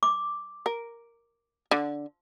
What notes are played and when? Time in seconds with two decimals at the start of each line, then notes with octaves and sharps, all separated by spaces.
0.03 D6
0.66 A#4
1.71 D3